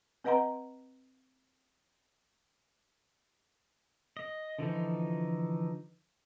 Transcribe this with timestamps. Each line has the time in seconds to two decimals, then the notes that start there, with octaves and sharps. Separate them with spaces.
0.24 C4 B4 D#5 F#5 A#5 C6
4.17 D#5
4.59 D3 E3 F3 D#4